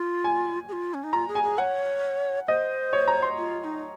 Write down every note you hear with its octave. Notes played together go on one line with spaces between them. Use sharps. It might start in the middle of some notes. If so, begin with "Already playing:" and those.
Already playing: F4
G#5
G#4
F4
C#4
D#4
F4 A#5
G#4
G#5
G#4
C#5 F#5
C5 D#5
C#5
A#5
C6
F4
F4
D#4